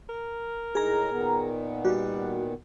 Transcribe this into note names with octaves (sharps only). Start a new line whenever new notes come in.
A#4
A2 G#3 D#4 G#4 A#5
A#2 D#3 B3
G3 F#4